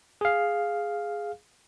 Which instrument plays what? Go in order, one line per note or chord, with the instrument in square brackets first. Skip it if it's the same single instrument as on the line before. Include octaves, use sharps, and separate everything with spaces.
[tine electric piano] G#4 F5